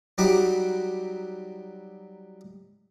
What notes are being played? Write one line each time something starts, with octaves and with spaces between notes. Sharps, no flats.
F#3 G3 D#4 F#4 B5 D6